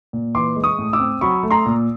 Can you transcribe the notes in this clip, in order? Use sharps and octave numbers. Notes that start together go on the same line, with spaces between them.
A#2
E3 C6 D6
G#3
C#6 D#6
A2
D6 E6
C4
F#3 B5 C#6
A3
A#5 C6
A#2